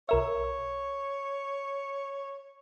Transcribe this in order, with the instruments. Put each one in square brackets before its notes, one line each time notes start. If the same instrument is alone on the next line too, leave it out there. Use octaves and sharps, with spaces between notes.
[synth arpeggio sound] B1 A#4 E5 [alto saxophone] C#5